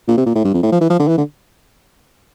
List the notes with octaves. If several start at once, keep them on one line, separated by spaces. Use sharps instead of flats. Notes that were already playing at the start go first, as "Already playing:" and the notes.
A#2
C3
A#2
A2
G2
F2
A2
F3
E3
F3
D3
E3
D3